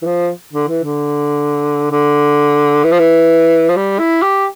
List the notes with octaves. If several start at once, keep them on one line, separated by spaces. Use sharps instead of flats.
E3
F3
D3
E3
D3
D3
E3
F3
E3
F3
G3
E4
G4